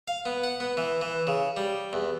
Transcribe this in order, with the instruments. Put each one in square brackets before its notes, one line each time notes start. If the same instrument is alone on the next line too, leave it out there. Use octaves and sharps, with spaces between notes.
[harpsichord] F5
B3
F#5
B3
E3
E3
C#3
G3
E2